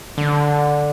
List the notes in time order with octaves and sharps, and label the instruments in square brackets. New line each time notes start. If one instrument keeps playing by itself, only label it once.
[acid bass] D3